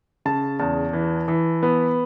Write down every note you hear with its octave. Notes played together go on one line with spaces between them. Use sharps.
C#3 A5
E2 A5
E3
E3
B3